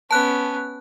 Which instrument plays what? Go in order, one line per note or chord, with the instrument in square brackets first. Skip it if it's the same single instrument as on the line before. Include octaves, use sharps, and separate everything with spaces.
[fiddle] B3 C#4 [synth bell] A5 F#6